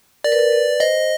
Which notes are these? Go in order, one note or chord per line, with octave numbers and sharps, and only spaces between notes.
A#4 D5
B4
A#4
B4
C5 D#5